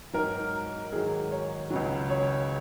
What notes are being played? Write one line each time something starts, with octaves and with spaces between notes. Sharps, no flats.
G#2 F#3 A#4
G#2 D#3 F#3 G#4
C#5
C#2 C#3 F#3
C#5